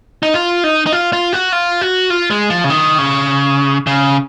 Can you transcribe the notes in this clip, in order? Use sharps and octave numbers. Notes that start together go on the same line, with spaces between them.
D#4
F4
D#4
D#4
F4
F4
F#4
F4
F#4
F4
G#3
F3
C#3
D#3
C#3
C#3